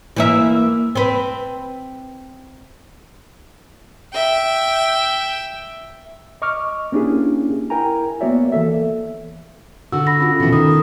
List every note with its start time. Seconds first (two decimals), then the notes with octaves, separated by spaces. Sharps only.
0.16 E3 A#3 E5
0.95 C4 B4
4.14 E5 G5
6.42 D#5 C#6 D6 F6
6.92 A#3 C#4 D4 E4 G4 G#4
7.70 E4 A#4 G5 G#5 A#5
8.21 A#3 B3 F#4 C#5 D5 E5
8.52 E3 A#3 A4 E5
9.92 D3 F#4 E6
10.07 B5 A#6
10.20 C#4 F4 A4
10.40 B2 E3
10.53 D#3 D#6